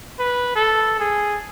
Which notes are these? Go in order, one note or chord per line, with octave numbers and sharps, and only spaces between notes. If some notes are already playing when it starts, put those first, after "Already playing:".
B4
A4
G#4